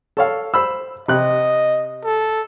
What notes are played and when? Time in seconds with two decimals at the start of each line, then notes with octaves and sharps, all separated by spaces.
0.17 A4 C#5 F5
0.54 C5 B5 E6
1.08 C3 D#5 F#6
2.04 A4